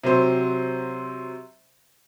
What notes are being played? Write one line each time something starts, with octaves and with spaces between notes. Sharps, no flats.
C3 F#3 C5